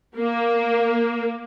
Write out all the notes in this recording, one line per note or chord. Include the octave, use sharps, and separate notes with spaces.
A#3